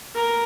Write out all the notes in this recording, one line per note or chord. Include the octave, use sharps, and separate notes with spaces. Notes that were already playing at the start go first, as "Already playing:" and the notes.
A#4